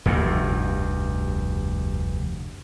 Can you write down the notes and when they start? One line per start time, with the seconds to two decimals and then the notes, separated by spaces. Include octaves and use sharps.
0.06 F1 D2 G2